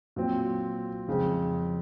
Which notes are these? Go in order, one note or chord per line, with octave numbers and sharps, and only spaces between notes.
A#2 F#3 C4
F2 C#3 G#3 C4